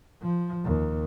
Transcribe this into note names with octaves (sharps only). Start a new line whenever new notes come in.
F3
D#2